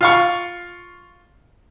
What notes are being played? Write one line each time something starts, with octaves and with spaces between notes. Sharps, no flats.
F4 F5 C#6